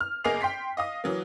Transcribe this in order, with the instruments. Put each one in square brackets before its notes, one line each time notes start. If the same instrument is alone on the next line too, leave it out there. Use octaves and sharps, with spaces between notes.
[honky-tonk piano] F6
G1 A#3 G#4 D#5 C7 F7
G5 C6 B6 C7
D#5 F5 D#6
E3 F#3 A#3